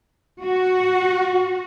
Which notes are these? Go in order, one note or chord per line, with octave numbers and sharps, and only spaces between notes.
F#4